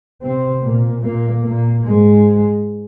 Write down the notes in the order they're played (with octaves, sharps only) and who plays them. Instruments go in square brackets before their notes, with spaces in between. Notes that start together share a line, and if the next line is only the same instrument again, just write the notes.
[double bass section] C3 C4
A#2 A#3
A#2 A#3
A#2 A#3
G#2 G#3